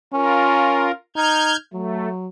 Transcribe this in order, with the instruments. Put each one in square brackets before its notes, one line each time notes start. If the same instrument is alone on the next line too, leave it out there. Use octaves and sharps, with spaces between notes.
[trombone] C#4 [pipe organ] F4 A#4
[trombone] D#4 [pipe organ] F6 G6 G#6
[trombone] F#3 [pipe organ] A3